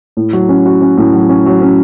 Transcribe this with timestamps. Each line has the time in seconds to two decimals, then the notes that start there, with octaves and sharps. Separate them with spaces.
0.17 A2
0.33 F#3
0.49 C#4
0.66 F#4
0.82 C#4
0.97 A2
1.14 F#3
1.29 C#4
1.46 F#3
1.62 C#4